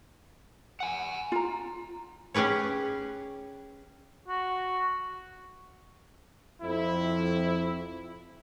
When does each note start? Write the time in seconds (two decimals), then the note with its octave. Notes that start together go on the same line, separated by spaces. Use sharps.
0.80 F#5 G#5
1.32 F4 A#5
2.34 C#4 G4 G#4 B4 C#5
4.28 F#4
6.62 F2 E4